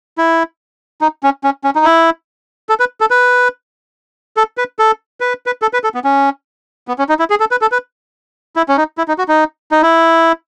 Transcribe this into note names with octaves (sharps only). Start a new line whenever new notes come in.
E4
D#4
C#4
C#4
C#4
D#4
E4
A4
B4
A4
B4
A4
B4
A4
B4
B4
A4
B4
A4
B3
C#4
B3
C#4
D#4
E4
G#4
A4
B4
A4
B4
E4
C#4
D#4
E4
D#4
F#4
D#4
D#4
E4